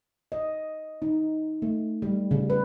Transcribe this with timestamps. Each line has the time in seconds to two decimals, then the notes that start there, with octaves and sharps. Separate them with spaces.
0.32 D#5
1.02 D#4
1.62 A3
2.02 G3
2.31 C#3
2.50 B4